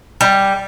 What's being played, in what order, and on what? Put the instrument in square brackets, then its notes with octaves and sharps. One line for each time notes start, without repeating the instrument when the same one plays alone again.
[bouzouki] G3